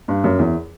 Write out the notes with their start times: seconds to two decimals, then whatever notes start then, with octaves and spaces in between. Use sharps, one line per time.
0.08 G2
0.24 F#2
0.39 E2